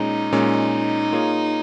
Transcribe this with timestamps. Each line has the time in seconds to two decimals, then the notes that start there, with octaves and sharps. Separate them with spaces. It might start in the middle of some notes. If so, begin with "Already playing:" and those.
Already playing: A#2 G#3 C#4 D#4
0.32 A#2 G#3 C#4
1.12 A#3 F4 G#4 C#5